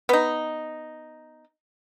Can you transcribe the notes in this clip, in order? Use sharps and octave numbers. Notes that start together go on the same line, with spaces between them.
B3 D#4